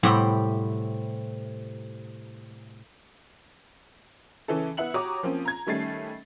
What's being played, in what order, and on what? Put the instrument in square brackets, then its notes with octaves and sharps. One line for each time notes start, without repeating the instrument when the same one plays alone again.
[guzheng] A2 C3 G3 C4 F#5 B5
[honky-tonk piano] C#3 E3 C#4 E4 A4
B3 E4 F#5 F#7
F#4 G4 C#5 A#5 D6 D#6
F3 A#3 C4 C#4 F4
A#5 G#6
D#3 G3 A3 C#4 A6 C7